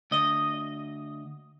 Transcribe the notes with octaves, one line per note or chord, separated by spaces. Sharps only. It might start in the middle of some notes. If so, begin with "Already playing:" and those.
D2 D#5